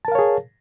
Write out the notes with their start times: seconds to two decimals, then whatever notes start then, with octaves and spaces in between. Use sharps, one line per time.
0.05 A5
0.08 A#4
0.12 F5
0.15 C#5
0.19 G#4